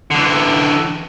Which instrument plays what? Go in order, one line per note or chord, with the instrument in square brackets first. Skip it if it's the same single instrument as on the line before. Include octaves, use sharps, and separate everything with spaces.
[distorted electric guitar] D3 E3